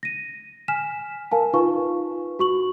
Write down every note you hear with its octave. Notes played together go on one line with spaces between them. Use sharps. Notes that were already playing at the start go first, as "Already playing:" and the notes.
A#6 D#7
G#5 F6 B6 E7
A#4 F5 G#5 A5
D#4 F4 B4 F5 C#6
F#4 C#6 F#7